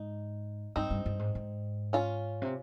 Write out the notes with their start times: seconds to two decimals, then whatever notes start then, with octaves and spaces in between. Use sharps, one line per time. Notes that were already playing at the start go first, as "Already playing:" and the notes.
Already playing: G#2 D#4
0.76 G2 C4 D#4
0.91 G2
1.06 G2
1.19 G#2
1.35 G#2
1.93 C#4 F4
2.42 C3